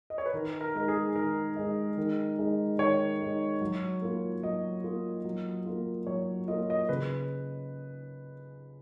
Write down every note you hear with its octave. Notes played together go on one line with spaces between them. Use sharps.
D#5
C#5
B4
D#3 A#4
A#4
G#3 D#4 A#4
G#4
D#3 A#4
G#3 D#4
D#3
G#3 D#4
D#3 C#5
G#3 D#4
F#3
A#3 F4
F#3 D#5
A#3 F4
F#3
A#3 F4
F#3 C#5
A#3 F4 D#5
D#5
C#3 B4